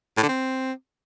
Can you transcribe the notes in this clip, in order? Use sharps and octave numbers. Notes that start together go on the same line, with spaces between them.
A2
D3
C4